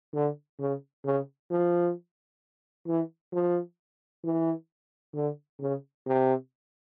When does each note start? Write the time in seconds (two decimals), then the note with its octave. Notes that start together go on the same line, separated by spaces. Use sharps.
0.14 D3
0.60 C#3
1.05 C#3
1.50 F3
2.87 E3
3.32 F3
4.24 E3
5.15 D3
5.60 C#3
6.06 C3